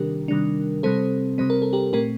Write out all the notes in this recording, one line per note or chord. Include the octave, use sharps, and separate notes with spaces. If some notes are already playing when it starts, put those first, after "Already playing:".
Already playing: C3 D#3 G3 D4 G4 A#4
C3 D#3 G3 D4
C3 G3 C4 A4 C5
C3 G3 C4 C5
A#4
A4
G4 A#4
A#2 A3 C4 G4 A#4